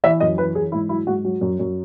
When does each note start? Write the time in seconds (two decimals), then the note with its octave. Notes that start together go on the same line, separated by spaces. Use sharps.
0.04 E3 E5
0.20 F#2 D#5
0.37 E3 B4
0.55 E3 G#4
0.72 G#2 E4
0.89 F#3 E4
1.07 G#2 F#4
1.24 F#3
1.41 F#2
1.59 F#2